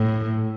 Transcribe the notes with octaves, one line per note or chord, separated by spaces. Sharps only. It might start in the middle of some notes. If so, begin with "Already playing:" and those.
Already playing: A2